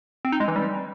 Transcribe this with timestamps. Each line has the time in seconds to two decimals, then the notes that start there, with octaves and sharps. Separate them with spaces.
0.25 C4
0.32 D#4
0.40 G#3
0.48 E3
0.56 G3